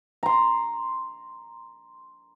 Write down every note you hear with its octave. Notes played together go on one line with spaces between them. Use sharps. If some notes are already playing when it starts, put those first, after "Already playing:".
A#5 C6